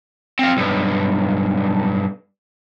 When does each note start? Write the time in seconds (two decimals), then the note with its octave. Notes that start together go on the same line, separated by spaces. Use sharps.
0.39 C4 F5
0.57 B1 G2